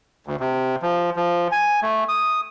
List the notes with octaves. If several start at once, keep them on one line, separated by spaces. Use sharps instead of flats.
D2
C3
F3
F3
G#5
A3
D#6